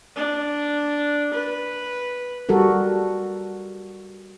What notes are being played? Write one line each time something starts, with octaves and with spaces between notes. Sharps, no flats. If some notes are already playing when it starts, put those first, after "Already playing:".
D4
B4
G3 F#4 A4 A#4